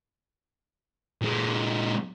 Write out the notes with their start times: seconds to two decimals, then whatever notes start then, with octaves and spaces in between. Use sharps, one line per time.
1.22 A#2 G#3